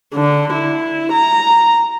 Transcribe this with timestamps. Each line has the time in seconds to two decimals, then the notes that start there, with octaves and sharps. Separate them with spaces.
0.15 D3
0.53 E4
1.13 A#5